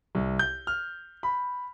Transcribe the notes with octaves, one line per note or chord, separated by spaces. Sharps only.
C2
G6
F6
B5